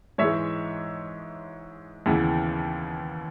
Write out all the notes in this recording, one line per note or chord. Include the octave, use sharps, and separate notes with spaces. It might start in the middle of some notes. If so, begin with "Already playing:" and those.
G#2 E3 G#3 C#5 E5
D#2 C#3 E3 B3